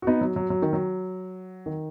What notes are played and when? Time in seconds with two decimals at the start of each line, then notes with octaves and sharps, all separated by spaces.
0.02 F#4
0.07 B3 D#4
0.21 F#3
0.36 F#3
0.50 F#3
0.62 D#3
0.73 F#3
1.66 D#3